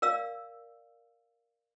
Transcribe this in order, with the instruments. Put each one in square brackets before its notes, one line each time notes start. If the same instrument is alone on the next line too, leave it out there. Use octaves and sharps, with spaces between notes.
[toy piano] A#4 D5 F5 E6